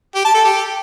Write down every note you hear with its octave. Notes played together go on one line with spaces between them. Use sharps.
G4
A5
A4
G4